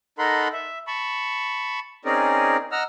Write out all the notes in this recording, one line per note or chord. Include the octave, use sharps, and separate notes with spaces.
D#4 A4 A#4 F#5 B5 C6
E5
A5 B5 C#6
C4 C#4 D#4 G#4 A#4 D5
D#5 F#5 A#5 E6 F6